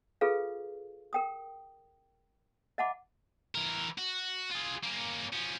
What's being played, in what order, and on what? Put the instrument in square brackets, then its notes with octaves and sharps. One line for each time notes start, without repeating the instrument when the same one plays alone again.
[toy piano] F4 G#4 A4 B4 F5
A#4 G5 D#6
D#5 E5 F#5 A5 B5 D6
[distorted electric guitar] E3 A#4
F#4
F4 G#4
A#3 C#4
F3 C#4